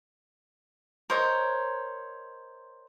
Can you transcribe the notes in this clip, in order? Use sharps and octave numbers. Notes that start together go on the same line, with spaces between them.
A#4 C5 C#5 D#5